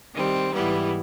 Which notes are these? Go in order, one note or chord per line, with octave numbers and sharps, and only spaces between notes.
D#3 G3 C4
G#2 E3 G3 B3 E4